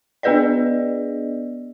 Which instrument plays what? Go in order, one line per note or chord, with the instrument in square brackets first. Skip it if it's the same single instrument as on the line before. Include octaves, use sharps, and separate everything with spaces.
[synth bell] B3 D4 G#4 B4 D5 D#5